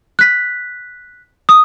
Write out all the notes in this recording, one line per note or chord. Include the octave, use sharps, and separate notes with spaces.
F#6 B6
D#6